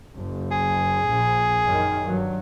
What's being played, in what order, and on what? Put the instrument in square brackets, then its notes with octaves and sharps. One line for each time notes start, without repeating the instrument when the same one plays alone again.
[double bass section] F#1
[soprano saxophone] G#4
[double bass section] A#1
F#2 D#3
G2 F#3